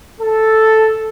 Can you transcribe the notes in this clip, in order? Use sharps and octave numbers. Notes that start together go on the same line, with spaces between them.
A4